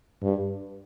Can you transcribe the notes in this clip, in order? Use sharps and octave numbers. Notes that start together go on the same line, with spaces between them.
G2